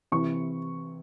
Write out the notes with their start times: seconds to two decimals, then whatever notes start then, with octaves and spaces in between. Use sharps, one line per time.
0.12 C3 E3 C#6